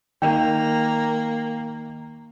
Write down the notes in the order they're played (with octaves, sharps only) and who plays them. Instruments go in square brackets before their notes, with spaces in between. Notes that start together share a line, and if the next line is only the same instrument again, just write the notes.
[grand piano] D#3 [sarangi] A#3 [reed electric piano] G5